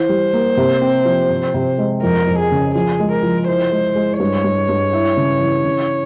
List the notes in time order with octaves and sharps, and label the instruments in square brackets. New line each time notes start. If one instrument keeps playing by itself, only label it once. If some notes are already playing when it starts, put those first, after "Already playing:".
Already playing: [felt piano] E3 [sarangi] C5
[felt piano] G3
A#3
C3
C4
F3
C3
C3
G#3
[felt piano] F2 [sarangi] A#4
[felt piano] F2
[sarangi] G#4
[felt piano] C#3
[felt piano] F3 [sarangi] G#4
[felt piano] G#3
[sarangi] A#4
[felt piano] F3
[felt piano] E4 [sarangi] C5
[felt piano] G#3
G#3
[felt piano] G2 [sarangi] C#5
[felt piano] G2
G2
E4
C#3
E3
C#3